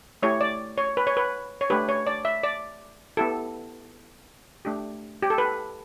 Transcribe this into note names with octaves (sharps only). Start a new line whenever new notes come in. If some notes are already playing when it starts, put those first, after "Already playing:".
A3 E4 G4 C#5
D5
C#5
B4
C#5
B4
C#5
A3 D4 G4 B4
C#5
D5
E5
D5
B3 E4 G4 A4
A3 D4 G4
G4
A4
B4